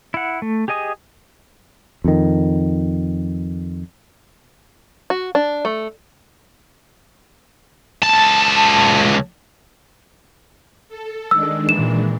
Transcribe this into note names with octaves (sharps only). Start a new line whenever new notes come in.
E4 F#5
A3
G4 G#4 D#5 G#5 D#6
F2 D#3
F#4
D4
A3
C#2 A5
A4
D#3 G#3 D4 E6
A#2 E3 E7